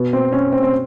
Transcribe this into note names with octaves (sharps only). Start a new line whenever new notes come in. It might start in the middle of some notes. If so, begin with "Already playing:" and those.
Already playing: B2 B3
C4
C#4
C4
C4